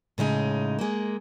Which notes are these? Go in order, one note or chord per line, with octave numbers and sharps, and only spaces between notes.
A2 C#3 G#3 D#4
G#3 A#3